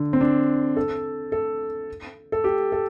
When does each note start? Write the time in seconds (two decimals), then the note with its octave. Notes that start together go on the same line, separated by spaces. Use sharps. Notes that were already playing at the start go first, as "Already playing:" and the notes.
Already playing: D3
0.13 C4
0.21 D4
0.76 A4
1.32 A4
2.32 A4
2.44 G4
2.72 A4